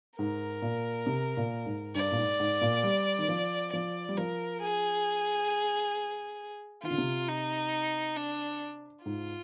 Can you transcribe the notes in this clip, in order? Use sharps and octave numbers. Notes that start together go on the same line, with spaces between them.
G#2 A#4
A#2
C3
A#2
G#2
G2 D5
A#2
G#2
G#2
A#2
G3
D#3
F3
F3 D5
G3
F3 A#4
G#4
D#3 F4
D3
C3
D#4
D4
G#2 F4